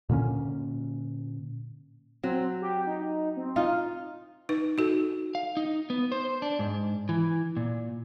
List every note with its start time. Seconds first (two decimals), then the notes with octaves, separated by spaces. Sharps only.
0.09 A#2 D3 A#3 C#4
2.23 F#3 C4
2.62 G4
2.87 D#4
3.37 C4
3.56 D#4 F4
4.49 D#4 B4
4.78 D#4 F#4 A4
5.35 F5
5.57 D#4
5.90 B3
6.12 C5
6.42 D4
6.59 G#2
7.09 E3
7.57 A#2